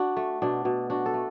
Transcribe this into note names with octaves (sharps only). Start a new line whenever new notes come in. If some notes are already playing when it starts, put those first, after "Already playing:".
Already playing: D4 F#4
A3
B2 D4
B2
D4 F#4
A4
A3